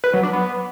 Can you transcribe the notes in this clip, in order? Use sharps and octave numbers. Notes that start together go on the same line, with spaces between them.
B4
F#3
D4
B3